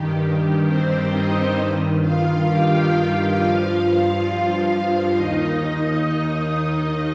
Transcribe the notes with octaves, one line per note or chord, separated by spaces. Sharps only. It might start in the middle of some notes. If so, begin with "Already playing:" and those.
Already playing: G2 D#3 G4
C4 C5
D#4 D#5
G2 D#3
F4 F5
G4 G5
G2 F3 F4 F5
F4 F5
D#2 D#3 D#4 D#5
D#4 D#5